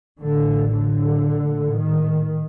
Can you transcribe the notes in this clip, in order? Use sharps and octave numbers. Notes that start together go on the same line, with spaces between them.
A1 A2 D3
D3
A#1 A2
D#3